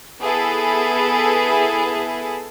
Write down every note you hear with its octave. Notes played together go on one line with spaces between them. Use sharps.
B3 E4 G#4 A4